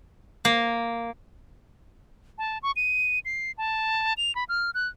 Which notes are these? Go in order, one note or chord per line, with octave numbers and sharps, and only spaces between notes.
A#3
A5
C#6
D#7
C7
A5
F7
B5
F6
F#6